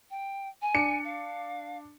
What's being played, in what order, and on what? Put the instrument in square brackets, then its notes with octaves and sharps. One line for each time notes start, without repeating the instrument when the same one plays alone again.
[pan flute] G5
G#5
[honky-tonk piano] D4 C#7
[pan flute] F5